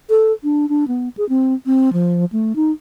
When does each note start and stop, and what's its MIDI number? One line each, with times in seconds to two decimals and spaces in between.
0.10 0.32 69
0.44 0.68 62
0.69 0.88 62
0.88 1.09 59
1.17 1.27 68
1.29 1.54 60
1.66 1.92 60
1.93 2.25 53
2.32 2.55 57
2.56 2.71 63